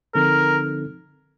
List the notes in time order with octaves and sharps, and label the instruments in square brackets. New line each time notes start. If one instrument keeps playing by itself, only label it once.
[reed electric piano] D3 F3 C4 D#4 A4 [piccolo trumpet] A#4